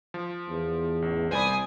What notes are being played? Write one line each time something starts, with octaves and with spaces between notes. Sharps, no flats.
F3
E2
A1
C2 C5 D5 G#5 B5 D#6